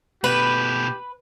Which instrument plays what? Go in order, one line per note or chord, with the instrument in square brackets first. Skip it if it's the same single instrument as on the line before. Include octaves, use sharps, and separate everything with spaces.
[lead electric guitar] B2 A3 [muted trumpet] G4 [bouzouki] B4